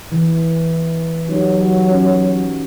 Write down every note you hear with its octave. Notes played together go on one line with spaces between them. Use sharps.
E3
F#3 D#4 G4
C#4 F#4